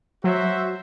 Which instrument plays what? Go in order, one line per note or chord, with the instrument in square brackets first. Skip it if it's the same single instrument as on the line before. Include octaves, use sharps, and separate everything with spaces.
[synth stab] F#3 [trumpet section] F#4 C5 E5